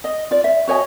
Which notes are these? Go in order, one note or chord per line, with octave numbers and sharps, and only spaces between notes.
D#5
F4 D5
E5
F#4 C#5 D#5 G#5